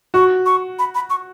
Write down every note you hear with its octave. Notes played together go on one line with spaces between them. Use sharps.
F#4 C#6
C#6
B5
B5
C#6